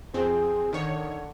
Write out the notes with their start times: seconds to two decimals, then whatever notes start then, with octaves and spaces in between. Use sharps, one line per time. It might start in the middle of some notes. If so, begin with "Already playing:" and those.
0.14 F2 C4 G#4
0.73 D3 D#3 C#5